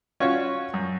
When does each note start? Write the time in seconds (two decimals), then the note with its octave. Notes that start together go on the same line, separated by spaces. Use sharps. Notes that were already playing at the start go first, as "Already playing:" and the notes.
0.20 C#4 F4 F#4 C#5
0.74 F#2